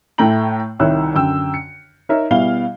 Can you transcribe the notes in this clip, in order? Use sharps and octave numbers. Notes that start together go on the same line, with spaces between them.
A2 A3 E4 G5 A#5 F#7
C2 D#3 E4 C#5 E6 F#6
F#2 D3 G5 E6
C#7
D#4 A#4 C#5 E5
B2 G3 E4 F5 G7